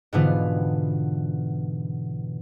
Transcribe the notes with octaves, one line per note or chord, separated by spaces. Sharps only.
G#2 B2 D3 E3 B3 F4